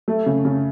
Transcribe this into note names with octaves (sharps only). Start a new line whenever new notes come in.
A3
C#3
C#3